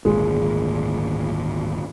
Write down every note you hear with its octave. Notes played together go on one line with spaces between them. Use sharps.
D1 G#1 A#2 G#3